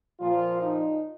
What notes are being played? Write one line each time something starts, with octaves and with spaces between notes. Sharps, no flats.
A#2 F3 F4
D#4